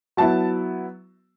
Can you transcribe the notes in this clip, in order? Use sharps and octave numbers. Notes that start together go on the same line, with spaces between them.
F#3 B3 E4 A5